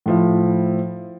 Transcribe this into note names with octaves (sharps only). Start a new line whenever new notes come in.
A2 F3 E4